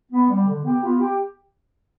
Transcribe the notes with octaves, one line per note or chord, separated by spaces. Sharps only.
B3
G3
D3
B3 G4
B3 F4
G4